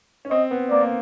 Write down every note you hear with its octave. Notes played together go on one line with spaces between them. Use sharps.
C#4
C4 D#5
B3
A#3 D5
A#3